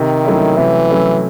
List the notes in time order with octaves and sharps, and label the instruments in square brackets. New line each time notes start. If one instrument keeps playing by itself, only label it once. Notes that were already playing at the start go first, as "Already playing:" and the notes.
Already playing: [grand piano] C3 [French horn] D#3
[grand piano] F#3 A3 C#4 E4
[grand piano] C3 [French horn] E3
[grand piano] F#3 A3 C#4 E4